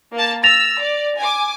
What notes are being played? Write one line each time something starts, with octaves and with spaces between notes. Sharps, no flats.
A#3 A5
E6 A6 A#6 F7
D5
G#5 D6